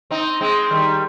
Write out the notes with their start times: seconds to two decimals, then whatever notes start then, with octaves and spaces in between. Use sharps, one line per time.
0.11 C4 D#4
0.41 G#3 C4
0.71 D#3 G3